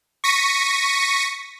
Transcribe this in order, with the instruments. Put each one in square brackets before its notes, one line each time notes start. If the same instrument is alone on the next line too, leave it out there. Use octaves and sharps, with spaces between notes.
[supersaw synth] C#6 A#6 B6 C#7 D#7